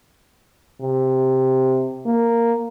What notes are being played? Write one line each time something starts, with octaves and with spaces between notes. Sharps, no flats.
C3
A#3